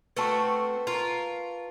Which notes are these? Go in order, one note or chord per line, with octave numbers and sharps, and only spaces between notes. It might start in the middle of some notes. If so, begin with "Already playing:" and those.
A3 C4 F#4 B4 A5 C#6
F4 A#4